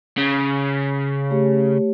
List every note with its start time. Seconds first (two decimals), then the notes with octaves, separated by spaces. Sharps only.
0.18 C#3
1.30 A3 G4 C#5